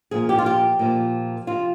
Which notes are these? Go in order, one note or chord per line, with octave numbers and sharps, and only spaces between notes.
A#2 F3 G#4
G4
F4
G4
A#2 F3
C3 F3 F4